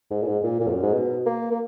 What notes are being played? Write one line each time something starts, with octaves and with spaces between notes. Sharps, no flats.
G#2
A#2
G#2
A#2
A#2
F2
F#2
G#2
B2
A#3
A#3